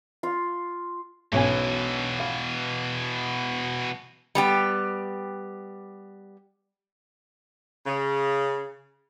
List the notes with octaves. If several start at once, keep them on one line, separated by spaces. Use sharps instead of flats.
F4
B1 B2 E3 C#4 G#5
F5
G3 B3 G4
C#3